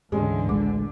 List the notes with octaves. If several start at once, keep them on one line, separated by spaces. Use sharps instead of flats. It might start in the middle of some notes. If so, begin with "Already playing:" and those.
D2 G#2 D3 E3 G#3 C#4
A1 G#3 D6